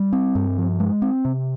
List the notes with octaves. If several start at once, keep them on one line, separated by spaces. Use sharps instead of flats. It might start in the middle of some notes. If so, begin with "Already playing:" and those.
Already playing: G3
C4
G2
F3
G#3
C4
C3